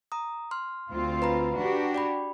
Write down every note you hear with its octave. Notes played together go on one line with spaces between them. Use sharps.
A#5 D#6
C6 F6
D2 C4 F4
B4 A#5 B5
D4 F#4 G4
D5 G5 B5